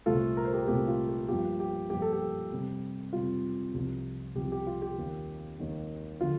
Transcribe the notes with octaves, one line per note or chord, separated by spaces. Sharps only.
C2 A#2 A3 C4 F4 A4
A#4
C5
G4 A#4
C2 A#2 A3 C4 F4 G4
F4
G4
G2 F3 A#3 F4 G4
G4
G2 F3 A#3 F4 G4
A4
G4
F2 C3 G3
F2 C3 G3 F4
C2 C3 F3
C2 C3 F3 G4
G4
F4
G4
D#2 D#3 A#3
D#2 D#3 A#3
D3 F3 F4